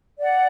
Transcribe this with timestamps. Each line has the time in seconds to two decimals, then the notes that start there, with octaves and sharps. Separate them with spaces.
0.19 D5 F#5